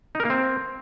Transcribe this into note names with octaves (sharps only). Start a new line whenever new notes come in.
D#4
A#4
A#3
C4